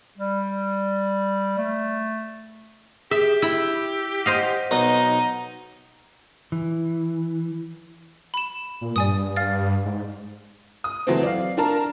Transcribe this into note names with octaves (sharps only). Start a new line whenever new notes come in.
G3
A3
G4 G#4 E5
E4 E6
C5 D#5 F5 F#5
B1 D#4 A#5
E3
B5 E7
A#2
G2 D5 G#5 D#6
F5 F6 A6
G#2
D#6
E3 F#3 A3 C4
D5 F5
D4 A#4 A5 A#5